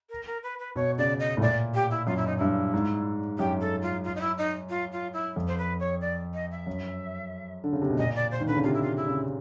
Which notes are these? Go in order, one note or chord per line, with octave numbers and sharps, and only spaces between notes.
A#4
A#4
B4
B4
B2 C#5
C#3 D5
D#5
A2
A#2 D5
G4
E4
F#2 F4
E4
D#4
G2 E4
G#2
F#2 G4
A4
F4
F4
D#4
E4
D#4
F4
F4
E4
F2
C5
B4
C#5
D5
D#5
E5
F#2
D3
C#3
C3
B2
A#2 D#5
D5
C5
D#3
D3 B4
C#3
C3 F4
E4
F4
E4
C#3